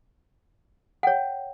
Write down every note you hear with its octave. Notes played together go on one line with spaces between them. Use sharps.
C#5 F#5 G5